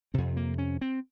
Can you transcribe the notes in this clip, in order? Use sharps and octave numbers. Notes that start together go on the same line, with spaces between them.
F2 C3 C4
A#3
C#4
C4